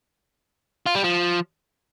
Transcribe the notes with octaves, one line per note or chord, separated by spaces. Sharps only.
F4
G3
F3